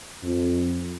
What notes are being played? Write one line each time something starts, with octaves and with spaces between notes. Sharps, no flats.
F2